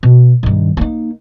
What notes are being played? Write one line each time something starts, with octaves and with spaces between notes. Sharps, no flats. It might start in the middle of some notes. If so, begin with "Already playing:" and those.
B2
G2 D#3
A#3 D#4